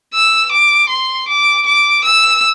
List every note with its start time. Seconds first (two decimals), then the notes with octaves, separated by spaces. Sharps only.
0.14 E6
0.51 D6
0.89 C6
1.28 D6
1.66 D6
2.04 E6